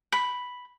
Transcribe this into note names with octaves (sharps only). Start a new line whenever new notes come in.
B5